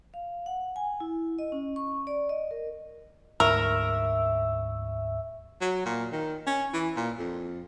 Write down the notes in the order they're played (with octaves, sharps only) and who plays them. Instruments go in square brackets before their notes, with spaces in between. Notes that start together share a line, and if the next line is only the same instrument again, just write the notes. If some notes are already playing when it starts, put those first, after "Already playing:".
[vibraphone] F5
F#5
G#5
E4
D#5
C#4
C#6
D5
D#5
A#4
[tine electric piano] D2 G#2 C#6 [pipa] A#4 [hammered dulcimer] E5
[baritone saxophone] F#3
A#2
D#3
C#4
E3
A#2
F2